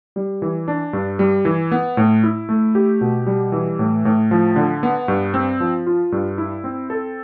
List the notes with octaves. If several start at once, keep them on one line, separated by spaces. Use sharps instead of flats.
G3
E3
D4
G2
G3
E3
B3
A2
E4
A3
G4
B2
G3
E3
A2
A2
F3
D3
B3
G2
C4
F3
F4
G2
E4
C4
A4